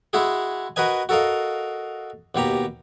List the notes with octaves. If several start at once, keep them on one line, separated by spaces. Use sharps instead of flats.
G#3 E4 F#4 G#4
F#4 A#4 B4 D#5 G#5
F#4 A4 A#4 D#5 F5
D#2 B2 G4 A#5